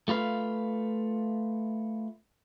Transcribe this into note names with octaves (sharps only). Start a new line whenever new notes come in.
A3 F4 B4 F5